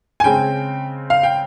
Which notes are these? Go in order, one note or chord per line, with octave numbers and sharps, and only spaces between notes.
G#5
C#3 G#3 C4 G5
F5
G5